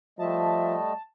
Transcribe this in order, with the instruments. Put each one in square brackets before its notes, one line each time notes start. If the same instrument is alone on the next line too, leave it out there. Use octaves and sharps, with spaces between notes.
[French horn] F3 [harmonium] G3 A3 D#5 [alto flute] E5 [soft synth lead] A5